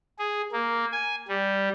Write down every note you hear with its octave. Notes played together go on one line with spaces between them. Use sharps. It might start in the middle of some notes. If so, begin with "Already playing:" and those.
G#4
A#3
G#5
G3